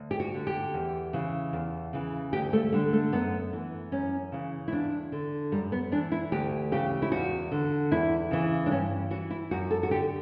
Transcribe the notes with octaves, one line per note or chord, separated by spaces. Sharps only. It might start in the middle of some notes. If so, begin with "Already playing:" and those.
Already playing: D2
G4
F#4
D3
G4
E2
C#3 E3
E2
C#3 E3
D2 G4
A3
D3 G3
A3
F#2 B3
E3
F#2 C#4
C#3 E3
E4
E2 D4
D3
F#2 G3
B3
E3 D4
E4
D2 G4
C#3 E3 G4
E4
E2 F#4
D3
E2 E4
C#3 E3
D4
G2 C#4
E3 F#4
E4
F#2 F#4
A4
F#4
D3 G4